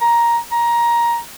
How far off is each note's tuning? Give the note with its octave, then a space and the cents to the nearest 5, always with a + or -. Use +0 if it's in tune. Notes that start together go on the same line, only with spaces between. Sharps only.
A#5 +10
A#5 +15